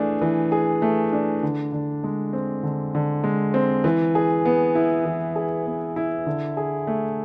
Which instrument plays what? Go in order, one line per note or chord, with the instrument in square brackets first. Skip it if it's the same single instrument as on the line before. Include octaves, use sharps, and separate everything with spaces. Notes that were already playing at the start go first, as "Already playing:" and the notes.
Already playing: [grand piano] E3 A3 D4 G#4
E3
G#4
A3
D4
D3
D3
G#3
C4
D3
D3
G#3
C4
E3
G#4
B3
E4
E3
G#4
B3
E4
D3
G#4
A3